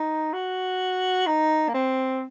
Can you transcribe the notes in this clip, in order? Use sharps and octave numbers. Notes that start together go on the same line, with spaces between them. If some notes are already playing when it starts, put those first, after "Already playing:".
Already playing: D#4
F#4
D#4
A#3
C4